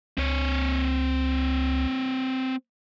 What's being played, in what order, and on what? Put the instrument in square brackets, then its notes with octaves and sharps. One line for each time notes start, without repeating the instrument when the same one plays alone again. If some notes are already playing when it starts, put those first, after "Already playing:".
[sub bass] C#2 [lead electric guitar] C4 C#5